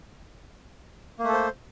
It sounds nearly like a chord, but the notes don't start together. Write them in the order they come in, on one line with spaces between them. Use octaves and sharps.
A#3 A3 A4 C5